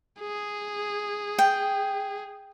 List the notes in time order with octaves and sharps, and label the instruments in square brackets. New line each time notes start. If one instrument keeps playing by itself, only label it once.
[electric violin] G#4
[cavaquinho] G5